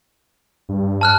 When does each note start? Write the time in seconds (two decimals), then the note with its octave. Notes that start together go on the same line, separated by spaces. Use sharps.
0.69 G2
1.01 A5 F6 F#6